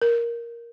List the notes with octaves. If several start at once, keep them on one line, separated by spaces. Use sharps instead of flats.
A#4